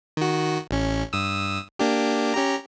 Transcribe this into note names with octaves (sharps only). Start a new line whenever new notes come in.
D#3 F#4
A1 C#4
G2 D#6 E6
A#3 D4 G4
C#4 G4 A#5